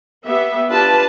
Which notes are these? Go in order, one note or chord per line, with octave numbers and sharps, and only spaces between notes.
B3 G4 E5
D4 F4 G4 B4 A5